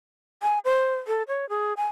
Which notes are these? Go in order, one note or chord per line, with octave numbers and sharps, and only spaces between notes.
G#5
C5
A4
C#5
G#4
G#5